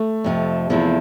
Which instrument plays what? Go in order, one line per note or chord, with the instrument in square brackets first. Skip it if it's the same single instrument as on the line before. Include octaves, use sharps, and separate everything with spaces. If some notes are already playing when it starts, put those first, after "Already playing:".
Already playing: [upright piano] A3
[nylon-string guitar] F2 C3 F3
E2 C3 F3 A#3 E4